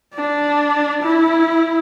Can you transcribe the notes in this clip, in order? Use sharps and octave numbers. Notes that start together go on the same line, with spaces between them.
D4
E4